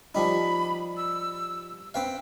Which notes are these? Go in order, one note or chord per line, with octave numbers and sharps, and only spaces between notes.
F3 G3 D#4 B5
E6
C4 B4 F5 G5